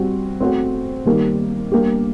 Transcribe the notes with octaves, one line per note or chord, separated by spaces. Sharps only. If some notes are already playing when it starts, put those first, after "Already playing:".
Already playing: G3 C4 F#4
A3 C4 F#4 C5
D#3 G3 A#3
G3 A#3 D4 G4